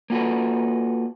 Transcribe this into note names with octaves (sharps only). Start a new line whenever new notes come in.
A#3 B3 F4 F#4 A4 B4